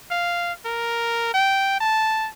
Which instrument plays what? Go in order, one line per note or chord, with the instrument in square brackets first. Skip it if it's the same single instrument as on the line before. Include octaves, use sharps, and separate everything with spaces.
[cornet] F5
A#4
G5
A5